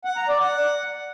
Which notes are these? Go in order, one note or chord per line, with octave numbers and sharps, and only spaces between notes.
F#5
A#5
D5
F#5